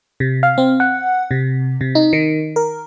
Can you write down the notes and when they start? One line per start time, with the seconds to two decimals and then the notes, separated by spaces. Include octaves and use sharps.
0.20 C3
0.43 F5
0.58 C4
0.80 F#5
1.31 C3
1.81 C3
1.95 D#4
2.13 D#3
2.56 A#4